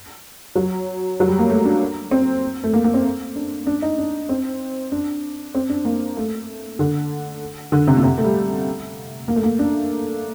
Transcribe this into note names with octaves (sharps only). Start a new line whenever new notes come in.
F#3
F#3
G3
A#3
A3
D4
C4
A3
A#3
A#3
C4
D4
D4
D#4
D4
C4
D4
C4
D4
A#3
A3
D3
D3
C3
A#2
C3
A3
G3
A#3
A3
A#3
D4